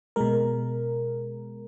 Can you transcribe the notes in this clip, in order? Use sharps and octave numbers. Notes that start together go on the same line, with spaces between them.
B2 G#3 A#4